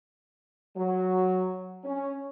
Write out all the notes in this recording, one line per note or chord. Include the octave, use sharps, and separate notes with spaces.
F#3
C#4